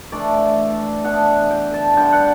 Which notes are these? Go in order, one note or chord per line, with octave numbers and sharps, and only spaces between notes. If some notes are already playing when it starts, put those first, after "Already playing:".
E3 A3 D4 D5
E3 B3 D4 F#5
G5
A5
D3 G3 D4 G5
F#5